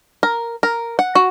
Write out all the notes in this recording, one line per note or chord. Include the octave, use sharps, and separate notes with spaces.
A#4
A#4
F#5
F#4